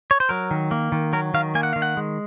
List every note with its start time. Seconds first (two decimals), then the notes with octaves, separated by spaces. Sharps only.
0.11 C#5
0.20 C5
0.29 F#3 A#4
0.51 D#3
0.71 A#3
0.92 D#3
1.13 F#3 A#4
1.34 D#3 F5
1.55 A#3 G#5
1.63 F#5
1.73 D#3 F5
1.82 F#5
1.97 G#3